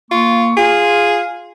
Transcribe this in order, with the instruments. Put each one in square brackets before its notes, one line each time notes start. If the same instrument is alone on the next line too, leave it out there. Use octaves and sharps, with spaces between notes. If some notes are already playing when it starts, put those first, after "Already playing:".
[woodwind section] A#3 C#6 [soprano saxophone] F4
[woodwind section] F4 F5 [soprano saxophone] G#4